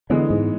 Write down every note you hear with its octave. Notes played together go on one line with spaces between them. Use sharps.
D3 E3 G#3 B3
G#2